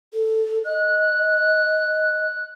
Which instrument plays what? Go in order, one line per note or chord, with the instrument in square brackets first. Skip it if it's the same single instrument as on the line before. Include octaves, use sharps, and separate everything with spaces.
[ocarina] A4
[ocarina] D#5 [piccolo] F#6